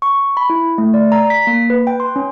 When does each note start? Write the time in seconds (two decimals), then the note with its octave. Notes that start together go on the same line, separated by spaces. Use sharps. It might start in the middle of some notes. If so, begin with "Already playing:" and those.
0.02 C#6
0.37 B5
0.50 E4
0.78 A3
0.94 D5
1.12 A#5
1.30 B6
1.47 A#3
1.70 B4
1.87 G5
2.00 C6
2.16 C#4